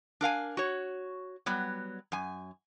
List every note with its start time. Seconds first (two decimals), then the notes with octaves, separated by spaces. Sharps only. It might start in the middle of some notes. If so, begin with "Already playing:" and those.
0.21 D4 A#4 F5 G#5
0.57 F#4 C#5
1.46 F#3 G3 B3
2.12 F#2 G#5